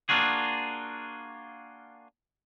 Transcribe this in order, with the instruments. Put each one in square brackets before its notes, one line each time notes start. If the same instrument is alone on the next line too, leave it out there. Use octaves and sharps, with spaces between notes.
[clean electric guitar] A#3 D4 F4 F#4 G#4